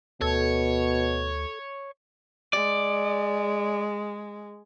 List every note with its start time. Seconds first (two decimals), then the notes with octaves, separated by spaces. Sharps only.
0.22 D2 B2 A4 C#5
2.53 G#3 D5